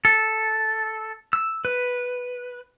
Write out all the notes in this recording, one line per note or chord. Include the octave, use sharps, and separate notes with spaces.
A4
E6
B4